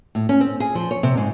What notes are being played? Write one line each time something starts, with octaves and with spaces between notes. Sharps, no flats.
A2
C#4
C4
G#4
F3
C#5
C3
G#2